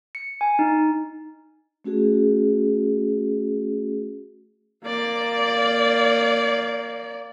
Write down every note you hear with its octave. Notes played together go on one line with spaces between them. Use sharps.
C#7
G#5
D#4
A3 C#4 F#4 G#4
A#3 D5